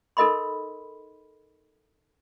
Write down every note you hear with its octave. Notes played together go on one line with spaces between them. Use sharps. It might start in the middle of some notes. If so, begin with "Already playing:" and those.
D#4 A4 A#4 D#5 B5 C6